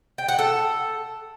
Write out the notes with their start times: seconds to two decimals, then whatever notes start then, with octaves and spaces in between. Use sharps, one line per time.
0.18 G5
0.28 F#5
0.39 A4